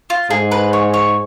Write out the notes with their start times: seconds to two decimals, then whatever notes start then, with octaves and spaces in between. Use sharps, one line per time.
0.10 F4
0.30 G#2 G#4
0.52 B4
0.73 C#5
0.94 C#5